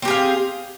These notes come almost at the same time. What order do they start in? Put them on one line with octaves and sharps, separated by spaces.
C4 G4 G#4 F5